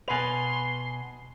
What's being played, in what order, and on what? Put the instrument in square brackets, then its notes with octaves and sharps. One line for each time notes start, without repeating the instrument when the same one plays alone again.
[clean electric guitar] B2 B4 [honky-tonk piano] G#5 F7 [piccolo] C6